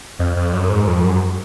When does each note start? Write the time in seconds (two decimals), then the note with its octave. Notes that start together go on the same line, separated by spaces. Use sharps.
0.19 F2
0.36 F2
0.53 F#2
0.70 G#2
0.87 F2
1.04 F#2